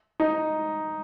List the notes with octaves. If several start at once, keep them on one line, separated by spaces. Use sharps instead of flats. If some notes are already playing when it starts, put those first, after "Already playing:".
D#4